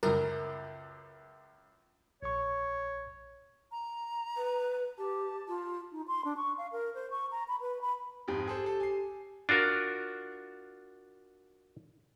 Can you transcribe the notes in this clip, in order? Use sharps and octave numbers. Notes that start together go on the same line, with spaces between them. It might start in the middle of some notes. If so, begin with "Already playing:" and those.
C#2 F#2 A#4
A#1 C#5 C#6
A#5
B4
G4 A5
F4
D#4
C6
D4
C#6
F5
A#4
C5
C#6
A#5
B5
B4
B5
F2 G#2 G4
G#4 A4 C5
A4
G#5 C7
D4 F4 F#4 A#4